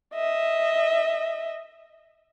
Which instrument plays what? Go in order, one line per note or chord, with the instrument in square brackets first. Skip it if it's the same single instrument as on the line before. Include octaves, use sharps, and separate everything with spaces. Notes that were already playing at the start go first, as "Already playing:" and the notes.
[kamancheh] D#5 E5